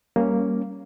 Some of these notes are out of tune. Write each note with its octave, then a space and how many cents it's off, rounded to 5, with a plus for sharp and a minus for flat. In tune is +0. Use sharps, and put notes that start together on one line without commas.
G3 +0 A#3 +0 C#4 +0